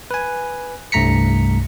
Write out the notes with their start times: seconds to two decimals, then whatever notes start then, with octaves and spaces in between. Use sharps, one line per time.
0.11 B4 G#5
0.92 C2 G2 A3 A#5 B6 C#7